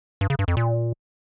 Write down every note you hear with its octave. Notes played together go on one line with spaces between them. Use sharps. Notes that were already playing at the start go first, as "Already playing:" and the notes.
G2
C#3
G2
F2
A#2